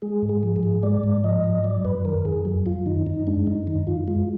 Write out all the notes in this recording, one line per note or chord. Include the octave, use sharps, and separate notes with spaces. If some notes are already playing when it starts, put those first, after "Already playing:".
G#3 G#4
G#2
G#4
F3
G#4
G#2
G#3 D5
G#2
F3 D#5
G#2
F#3 D5
F#2 B4
D#3 A#4
F#2 G#4
F#3
F#2 F4
D#3 D#4
F#2 D#4
G#3 D4
F#2 D#4
D#3 D#4
F#2 F4
G#3 F4